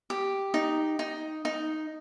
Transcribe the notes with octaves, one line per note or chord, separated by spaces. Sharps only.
G4
D#4
D#4
D#4